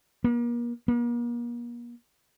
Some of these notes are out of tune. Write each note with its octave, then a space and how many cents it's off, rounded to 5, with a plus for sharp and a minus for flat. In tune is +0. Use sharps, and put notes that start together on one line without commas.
A#3 +40
A#3 +40